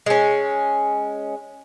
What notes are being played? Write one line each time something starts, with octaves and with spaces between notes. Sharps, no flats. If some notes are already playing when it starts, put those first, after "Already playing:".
G#3 C#4